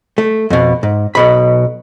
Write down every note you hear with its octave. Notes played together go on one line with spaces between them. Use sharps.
A3
F2 B2
G#2
B1 B2 B5